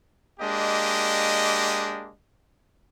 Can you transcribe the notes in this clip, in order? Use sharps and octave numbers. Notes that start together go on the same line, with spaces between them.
G#3 A#3 D4 G4 D#5